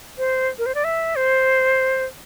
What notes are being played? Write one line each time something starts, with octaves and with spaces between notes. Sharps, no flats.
C5
A#4
C5
D5
E5
C5